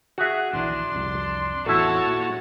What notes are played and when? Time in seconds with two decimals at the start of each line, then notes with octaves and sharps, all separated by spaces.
0.18 F#4 G#4 E5
0.53 A#1 D#2 E3 D4 C6
0.95 C2 F2
1.66 A1 E2 E4 F#4 A4 C#5 A5
2.07 A#2